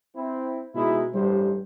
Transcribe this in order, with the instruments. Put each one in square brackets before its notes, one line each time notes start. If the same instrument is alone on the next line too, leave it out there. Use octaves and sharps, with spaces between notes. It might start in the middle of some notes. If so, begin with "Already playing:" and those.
[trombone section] C4 E4
[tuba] B2 [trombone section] G#3 D#4 E4
[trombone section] A1 G2 C5 [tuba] G3